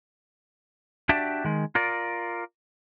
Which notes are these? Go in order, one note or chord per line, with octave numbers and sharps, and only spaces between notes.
D4 F#4 G4 D5 E5 A5
D#3 G#3
F4 A#4 D5